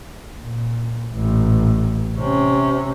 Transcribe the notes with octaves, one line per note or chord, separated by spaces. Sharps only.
A#2
A1 A#2
C3 C#4